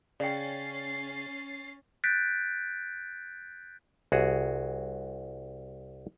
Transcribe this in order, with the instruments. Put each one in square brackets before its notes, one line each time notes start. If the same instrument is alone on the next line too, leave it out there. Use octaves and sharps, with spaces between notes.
[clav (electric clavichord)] C#3 [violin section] C#4 A6 C7 [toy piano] D5 G5
[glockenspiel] F#6 G6 A6 B6 D7
[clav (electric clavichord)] C2 F#4 G#4